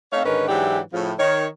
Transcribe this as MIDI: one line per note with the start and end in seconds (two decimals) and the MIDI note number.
0.13 0.25 57
0.13 0.25 60
0.13 0.25 63
0.13 0.25 73
0.13 0.25 77
0.25 0.47 44
0.25 0.47 50
0.25 0.47 51
0.25 0.47 61
0.25 0.47 70
0.25 0.47 71
0.48 0.79 44
0.48 0.79 52
0.48 0.79 54
0.48 0.79 62
0.48 0.79 64
0.48 0.79 67
0.93 1.12 45
0.93 1.12 49
0.93 1.12 53
1.19 1.47 51
1.19 1.47 73